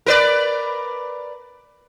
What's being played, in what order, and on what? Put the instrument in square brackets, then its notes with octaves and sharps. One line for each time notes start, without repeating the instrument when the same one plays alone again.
[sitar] A#4 B4 D5